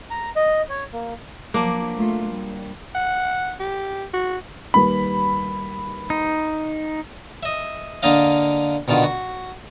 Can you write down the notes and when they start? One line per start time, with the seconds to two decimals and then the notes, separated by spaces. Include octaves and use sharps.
0.11 A#5
0.36 D#5
0.69 C#5
0.93 A#3
1.54 F3 F#3 A#3 D4
1.97 A3 F4
2.29 G3
2.95 F#5
3.60 G4
4.13 F#4
4.74 D#2 G3 B4 B5
6.10 D#4
7.43 D#5 E5
8.03 D3 A#3 D4 D#5 F5
8.88 B2 D3 D#3 F4
9.04 F#4